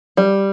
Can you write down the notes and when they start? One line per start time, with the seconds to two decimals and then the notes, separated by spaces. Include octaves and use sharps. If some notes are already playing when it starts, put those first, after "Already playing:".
0.17 G3